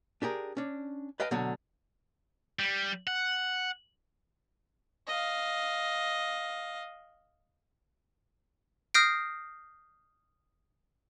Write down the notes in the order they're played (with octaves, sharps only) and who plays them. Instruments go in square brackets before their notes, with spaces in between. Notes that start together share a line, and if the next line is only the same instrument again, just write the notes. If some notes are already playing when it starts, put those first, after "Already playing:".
[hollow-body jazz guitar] D4 G4 G#4 A#4
C#4 D4
B4 D#5 F5 G5 A5
B2 D3 F#3 A3
[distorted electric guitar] G3
F#5
[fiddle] D#5 F5
[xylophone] D#6 F6 G6 A#6 C7 D7